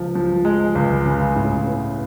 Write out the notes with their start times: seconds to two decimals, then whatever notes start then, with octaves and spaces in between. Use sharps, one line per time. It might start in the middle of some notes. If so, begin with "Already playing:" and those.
Already playing: C#2 F3
0.15 F3
0.45 G#3
0.75 C#2
1.06 C#3
1.36 A2
1.67 B3